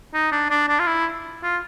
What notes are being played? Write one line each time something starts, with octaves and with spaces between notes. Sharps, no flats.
D#4
D4
D4
D4
F4
E4
F4